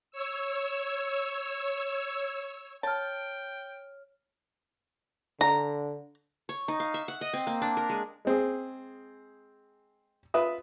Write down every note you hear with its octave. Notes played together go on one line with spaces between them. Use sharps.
C#5 E6
C#5 G5 A5 F6
D3 A#5
C#5
D#4
F5
E5
F#5
D#5
C4
A#3
D4
A#4
G#3
G#3 C4 G#4
F4 B4 E5 D#6